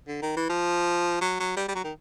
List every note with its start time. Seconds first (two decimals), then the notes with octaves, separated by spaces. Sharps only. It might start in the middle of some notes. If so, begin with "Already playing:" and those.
0.08 D3
0.22 D#3
0.37 E3
0.49 F3
1.21 F#3
1.40 F#3
1.57 G3
1.68 G3
1.75 F#3
1.84 D#3